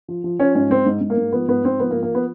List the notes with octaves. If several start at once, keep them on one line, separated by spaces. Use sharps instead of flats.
F3
F3
F3 C#4
G#2 C#4
G#2 C4
G#2
G#2
A#3
G#2
F3 B3
G#2 B3
G#2 C4
F3 B3
A#3
F3
A#3
F3 B3